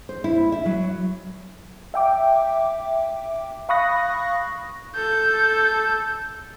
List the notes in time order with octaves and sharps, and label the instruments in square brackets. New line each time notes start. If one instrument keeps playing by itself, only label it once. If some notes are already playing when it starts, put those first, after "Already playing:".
[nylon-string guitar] C5
E4
E5
F#3
[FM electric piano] E5 G5 D6
F5 B5 C#6 D#6 F#6 A#6
[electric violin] A4 G6